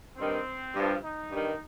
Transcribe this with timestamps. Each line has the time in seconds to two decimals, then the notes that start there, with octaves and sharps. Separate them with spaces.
0.17 G2 D#3 C4
0.75 G2 F3
1.03 D#4
1.31 G2 D#3